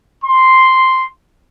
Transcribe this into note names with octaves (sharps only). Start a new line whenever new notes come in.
C6